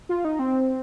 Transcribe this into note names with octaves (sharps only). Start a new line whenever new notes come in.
F4
D#4
C4